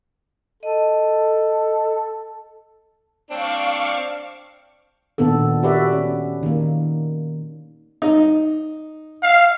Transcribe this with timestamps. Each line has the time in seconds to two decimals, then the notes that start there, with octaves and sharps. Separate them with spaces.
0.63 A4 D#5
3.31 C4 D4 F5 C#6 D6
5.18 A#2 D#3 B3 D4 A4
5.63 F#4 G4 B4 D5 E5
5.92 C#4
6.43 D#3 A#3
8.02 D#4
9.23 F5